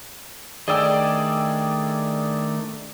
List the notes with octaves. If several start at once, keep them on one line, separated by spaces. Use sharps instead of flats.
D#3 A3 D4 G#4 D5 D#5 G5 E6